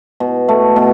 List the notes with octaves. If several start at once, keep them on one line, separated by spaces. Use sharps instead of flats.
B2
A3
B2